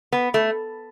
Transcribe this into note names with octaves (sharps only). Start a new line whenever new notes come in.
B3
A3